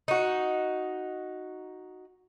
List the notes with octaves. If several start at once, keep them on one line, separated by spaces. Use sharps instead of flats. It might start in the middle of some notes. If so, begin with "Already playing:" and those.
D#4 F#4